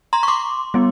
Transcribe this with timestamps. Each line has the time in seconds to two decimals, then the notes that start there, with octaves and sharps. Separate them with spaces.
0.13 A#5 C6
0.23 C#6
0.28 C6 D6
0.74 G3 B3